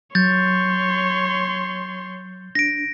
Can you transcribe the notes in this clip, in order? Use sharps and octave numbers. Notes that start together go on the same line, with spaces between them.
F#3 C#5 C6 G6 A6
D4 A#6 D7